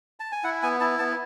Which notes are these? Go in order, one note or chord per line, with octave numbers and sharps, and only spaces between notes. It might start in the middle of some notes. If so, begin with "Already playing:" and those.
A5
G#5
E4 F#5
B3 G#5
E4 A5
B3 A5